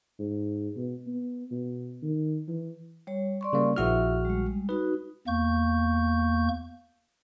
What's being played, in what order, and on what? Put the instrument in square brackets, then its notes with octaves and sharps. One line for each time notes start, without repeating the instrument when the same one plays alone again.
[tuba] G#2
B2
B3
B2
D#3
E3
[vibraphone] G3 C#5
D5 C6 C#6
[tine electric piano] C#3 G3 A#3
[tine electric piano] A#1 F#4 F6 [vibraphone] E4 G#4 E5
[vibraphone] G3 G#3
[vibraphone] D#4 F#4 [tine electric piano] B4
[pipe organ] E2 A#3 C#6 G6